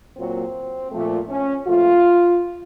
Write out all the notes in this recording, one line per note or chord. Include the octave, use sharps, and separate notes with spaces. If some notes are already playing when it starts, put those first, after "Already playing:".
A#2 F#3 A#3 C4
A#2 F3 A3
C#4
A#2 F3 A3 F4